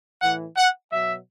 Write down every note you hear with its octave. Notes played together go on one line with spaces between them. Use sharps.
A2 E3 F#5
F#5
B2 F#3 E5